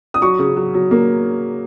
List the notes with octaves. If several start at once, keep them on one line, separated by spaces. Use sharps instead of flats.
D#6
F#3 C#6
C#3
F#3
F#3
A#3